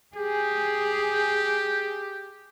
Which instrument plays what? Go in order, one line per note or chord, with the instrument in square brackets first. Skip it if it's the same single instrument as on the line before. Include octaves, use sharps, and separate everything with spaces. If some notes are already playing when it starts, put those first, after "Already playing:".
[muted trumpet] G4 [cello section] G#4